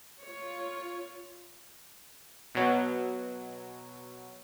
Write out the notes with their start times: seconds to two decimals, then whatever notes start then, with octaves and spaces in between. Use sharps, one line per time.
0.23 F4 C#5
2.55 B2 F#3